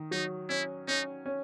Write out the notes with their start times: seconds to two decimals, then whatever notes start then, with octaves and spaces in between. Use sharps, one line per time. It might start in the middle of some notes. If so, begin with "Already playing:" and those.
Already playing: D#3
0.11 F#3 D#4
0.49 C#4 E4
0.88 C#4 D#4
1.26 C#4